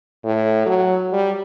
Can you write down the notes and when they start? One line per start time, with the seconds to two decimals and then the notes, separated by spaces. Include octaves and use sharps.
0.24 A2
0.66 F#3
1.13 G3